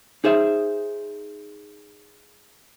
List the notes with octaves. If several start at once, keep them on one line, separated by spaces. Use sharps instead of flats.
D#4 G#4 C5 E5